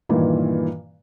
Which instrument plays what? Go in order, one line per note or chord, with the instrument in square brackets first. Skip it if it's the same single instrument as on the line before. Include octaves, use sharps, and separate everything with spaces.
[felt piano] G2 A#2 D#3 E3